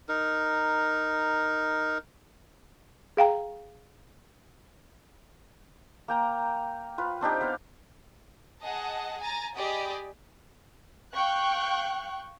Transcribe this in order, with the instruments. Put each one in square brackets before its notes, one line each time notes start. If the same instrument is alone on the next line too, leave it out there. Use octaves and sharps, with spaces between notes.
[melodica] D#4 A#4
[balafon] G#4 F5 G5 A#5
[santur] A#3 G5 A#5
F4 B4
C4 D4 D#4 G4
B3 B4 F5
[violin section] G#4 D#5 F#5 A5
G#5 A#5 A6
G4 G#4 D5 D#5 B5
[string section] F5 G5 C#6 F#6